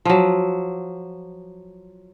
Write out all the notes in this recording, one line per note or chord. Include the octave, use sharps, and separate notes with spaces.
F3 F#3